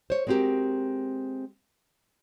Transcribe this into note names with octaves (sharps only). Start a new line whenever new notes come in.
C5 C#5
G#3 B3 C4 F#4 G4 A#4